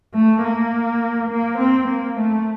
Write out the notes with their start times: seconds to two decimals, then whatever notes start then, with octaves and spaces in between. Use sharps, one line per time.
0.15 A3
0.43 A#3
1.30 A#3
1.59 C4
1.88 A#3
2.17 A3